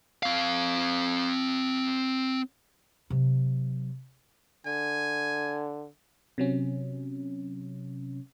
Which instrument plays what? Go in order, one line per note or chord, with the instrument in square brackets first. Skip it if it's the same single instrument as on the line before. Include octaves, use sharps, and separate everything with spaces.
[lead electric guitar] C4 F5
[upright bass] C3 F#3
[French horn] D3 [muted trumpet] G#5
[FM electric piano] C3 F#3 C#4